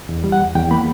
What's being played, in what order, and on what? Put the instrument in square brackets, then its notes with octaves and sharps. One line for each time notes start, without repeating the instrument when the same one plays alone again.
[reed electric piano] E2
G3
F#5
E2
E2 G5
A#3 B5